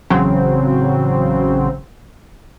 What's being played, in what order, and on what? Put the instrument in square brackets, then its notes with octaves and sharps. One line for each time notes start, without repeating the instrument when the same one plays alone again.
[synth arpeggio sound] A1 C#3 F#3 C4